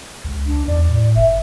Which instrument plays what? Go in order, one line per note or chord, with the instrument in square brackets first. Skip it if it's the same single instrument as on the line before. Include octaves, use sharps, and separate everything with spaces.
[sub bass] C#2
[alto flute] D4
[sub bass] E2 [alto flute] D5
[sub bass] A2
[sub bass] F#1 [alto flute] E5